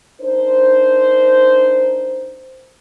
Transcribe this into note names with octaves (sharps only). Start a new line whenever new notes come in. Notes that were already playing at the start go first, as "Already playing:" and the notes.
D4 D#4 A#4 C5